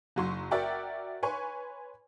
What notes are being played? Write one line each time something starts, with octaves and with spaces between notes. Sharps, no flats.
F#1 F#3 C6 C#6
F#4 A#4 D5 E5 F#5 G5
B4 C#5 G#5 C6 C#6